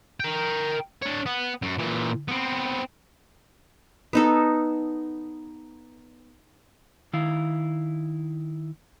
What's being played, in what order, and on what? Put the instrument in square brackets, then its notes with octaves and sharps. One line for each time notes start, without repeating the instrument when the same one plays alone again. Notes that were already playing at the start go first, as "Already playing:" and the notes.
[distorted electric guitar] A#4 G5
D4 C#5
B3
F#2
A#2 E3
B3 C4
[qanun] B3 D#4 A4
[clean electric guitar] D#3 E4 F5